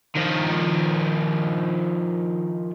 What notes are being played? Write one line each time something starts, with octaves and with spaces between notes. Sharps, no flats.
D#3 F3